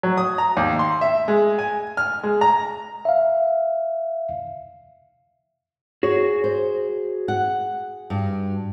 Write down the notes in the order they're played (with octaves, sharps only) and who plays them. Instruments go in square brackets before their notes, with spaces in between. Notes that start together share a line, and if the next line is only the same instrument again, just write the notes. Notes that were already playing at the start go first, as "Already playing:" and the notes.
[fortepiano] F#3
D#6
A#5
D#2
C6
E5
G#3
G#5
F6
G#3
A#5
[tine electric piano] E5 F5
[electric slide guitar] F#4 G#4 [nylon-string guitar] C#5
[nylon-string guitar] C5
F#5
G2